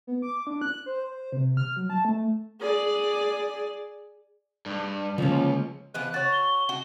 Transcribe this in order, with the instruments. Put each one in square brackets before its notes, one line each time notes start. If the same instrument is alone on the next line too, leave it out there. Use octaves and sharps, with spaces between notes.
[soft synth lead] B3
D6
D4
F#6
C5
C5
C3
F6
F#3
A5
A3
[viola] G#4 D5
[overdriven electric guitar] G2
[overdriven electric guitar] C#2 [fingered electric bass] D3 A#3 [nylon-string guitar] F3 C#4
[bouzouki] E3 F3 B3 [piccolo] F#6
[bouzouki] F#4 C#5 [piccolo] A6
[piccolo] G7
[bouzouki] F#4